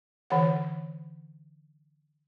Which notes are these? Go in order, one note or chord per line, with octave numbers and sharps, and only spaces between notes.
D3 E3 C#5 F#5